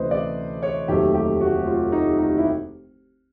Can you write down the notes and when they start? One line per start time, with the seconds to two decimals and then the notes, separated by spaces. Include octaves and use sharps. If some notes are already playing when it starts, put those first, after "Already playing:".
Already playing: D2 C3 E3 A3 C#4 B4 C5 D#5
0.11 D5
0.62 C#5
0.88 F1 D#2 D#3 F#3 A3 G4
1.14 G4
1.41 F#4
1.66 F4
1.92 D#4
2.18 D#4
2.37 E4